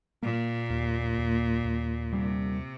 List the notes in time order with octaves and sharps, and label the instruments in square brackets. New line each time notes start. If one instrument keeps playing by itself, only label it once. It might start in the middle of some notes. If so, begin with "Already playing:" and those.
[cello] A#2 [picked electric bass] A#3
[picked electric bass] D#2
D#2
D#2
[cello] C3 [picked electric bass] G3